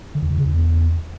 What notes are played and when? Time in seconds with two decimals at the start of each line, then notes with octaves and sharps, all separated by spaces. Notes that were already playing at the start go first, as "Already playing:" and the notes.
0.15 D3
0.22 E2
0.30 D3
0.38 C#3
0.45 E2